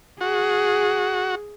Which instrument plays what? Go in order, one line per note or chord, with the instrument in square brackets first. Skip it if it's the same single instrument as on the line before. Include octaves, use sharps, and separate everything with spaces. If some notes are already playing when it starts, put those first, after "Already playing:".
[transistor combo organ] F#4 [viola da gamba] G#4